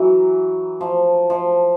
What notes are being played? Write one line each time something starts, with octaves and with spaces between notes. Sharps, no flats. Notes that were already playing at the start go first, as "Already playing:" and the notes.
Already playing: E3 F#3
F3
F3